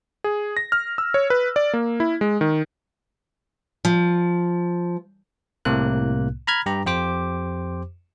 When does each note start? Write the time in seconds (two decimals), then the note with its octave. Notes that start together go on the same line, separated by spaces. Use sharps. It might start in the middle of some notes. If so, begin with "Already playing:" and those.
0.24 G#4
0.57 A#6
0.72 F6
0.98 E6
1.14 C#5
1.30 B4
1.56 D5
1.73 A#3
2.00 E4
2.21 G#3
2.41 D#3
3.85 F3
5.65 C2 A2 C3 A#3 F#6
6.47 A#5 B5 F6 G#6
6.66 G2 G4 A#5
6.86 F2 G4 C5 D6